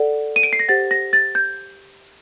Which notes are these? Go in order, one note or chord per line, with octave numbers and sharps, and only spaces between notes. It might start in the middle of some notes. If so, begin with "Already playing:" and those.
Already playing: A4 D5 F#5
D#7
D7
C7
A#6
G4 C5 F#5 A6
A#6
A6
G6